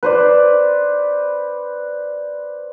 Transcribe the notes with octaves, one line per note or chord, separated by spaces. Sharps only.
B4 C5 D5